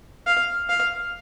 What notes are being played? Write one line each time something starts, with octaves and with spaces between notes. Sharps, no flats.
F5
F5